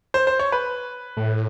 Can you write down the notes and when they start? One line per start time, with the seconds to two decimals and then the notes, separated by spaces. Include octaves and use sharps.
0.14 C5
0.27 C5
0.39 C#5
0.52 B4
1.17 A2